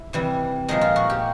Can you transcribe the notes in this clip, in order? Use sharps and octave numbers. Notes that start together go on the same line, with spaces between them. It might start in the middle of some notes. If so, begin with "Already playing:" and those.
Already playing: E4
C3 E3 G3
A#2 F3 G#3 D#4
F4
F#4
G4